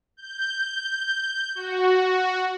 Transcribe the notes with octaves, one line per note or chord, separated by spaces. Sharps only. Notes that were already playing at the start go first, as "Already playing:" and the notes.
G6
F#4